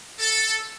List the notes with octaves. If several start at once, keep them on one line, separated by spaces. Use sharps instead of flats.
A4